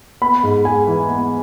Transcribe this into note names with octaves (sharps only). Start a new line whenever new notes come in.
B3 B5
G#2
G#3 G#5
E3
B3